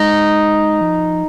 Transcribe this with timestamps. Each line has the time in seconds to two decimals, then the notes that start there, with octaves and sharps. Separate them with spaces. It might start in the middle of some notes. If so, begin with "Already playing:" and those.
Already playing: G#3 D#4
0.81 F3